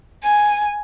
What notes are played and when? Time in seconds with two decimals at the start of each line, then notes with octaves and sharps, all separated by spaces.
0.23 G#5